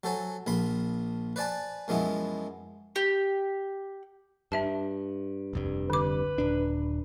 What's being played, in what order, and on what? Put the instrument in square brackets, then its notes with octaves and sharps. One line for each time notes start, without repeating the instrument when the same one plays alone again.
[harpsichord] F#3 A4 C5 G#5
A#1 F3 B5 C6
B4 C5 D5 G#5 A5
F#2 F3 G#3 B3 E4
[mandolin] G4
[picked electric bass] G2 [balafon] D4 E5 A5
[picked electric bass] F1 C2 G2
[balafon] D3 D6 [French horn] B4
[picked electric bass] D#1 D4